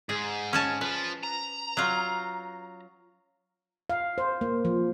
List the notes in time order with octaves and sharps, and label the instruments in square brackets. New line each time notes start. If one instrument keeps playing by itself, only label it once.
[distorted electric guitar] G#2 [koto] G#4
[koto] C#4 G#5 A5
[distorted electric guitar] F3 [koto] B4
[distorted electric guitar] A#5
[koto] F#3 F4
[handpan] F5
C5
A#3
F3